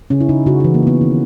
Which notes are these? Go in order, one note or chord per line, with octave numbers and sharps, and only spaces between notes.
C#3 C#4
E4
C#3 D#4
C#3 F#4
E3 F#4
A#3
C#3 B3
D#3 C#4